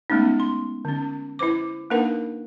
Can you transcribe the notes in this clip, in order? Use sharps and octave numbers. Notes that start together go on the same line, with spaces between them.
G#3 A3 B3 C#4 D#4
C6
D3 C#4
E4 B4 C5 D6
A#3 D4 D#4 A#4 B4 F#5